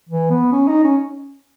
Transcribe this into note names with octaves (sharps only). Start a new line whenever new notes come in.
E3
B3
C#4
D#4
C#4